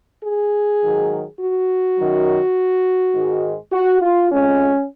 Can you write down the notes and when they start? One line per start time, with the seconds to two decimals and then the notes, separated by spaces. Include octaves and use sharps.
0.23 G#4
0.81 G#2 D#3 F#3
1.39 F#4
1.97 F#2 D#3 F#3
3.14 G#2 D#3 G#3
3.72 F#4
4.02 F4
4.31 F2 F3 G#3 C#4